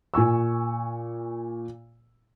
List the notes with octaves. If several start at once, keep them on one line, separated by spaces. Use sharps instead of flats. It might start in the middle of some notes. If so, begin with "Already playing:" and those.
A#2 G#5 C#6 E6